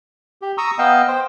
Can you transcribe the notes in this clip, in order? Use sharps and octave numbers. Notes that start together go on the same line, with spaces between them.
G4
A#5 C#6 D#6 E6
B3 D#5 F5 G5 E6
C5 G5